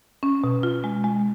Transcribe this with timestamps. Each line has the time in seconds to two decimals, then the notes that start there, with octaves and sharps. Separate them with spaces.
0.23 C#4
0.44 B2
0.63 F4
0.84 G#3
1.04 G#3